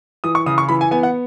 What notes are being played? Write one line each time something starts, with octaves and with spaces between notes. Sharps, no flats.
E3 D#6
C#6
C#3 D#6
C#6
E3 B5
G#5
B3 G#5
F#5